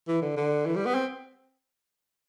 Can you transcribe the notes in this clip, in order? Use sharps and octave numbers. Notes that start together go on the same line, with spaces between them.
E3
D3
D3
E3
G3
B3
C4